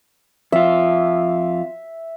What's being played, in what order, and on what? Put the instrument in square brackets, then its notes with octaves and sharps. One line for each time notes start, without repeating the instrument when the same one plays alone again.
[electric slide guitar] F2 F4 [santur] E5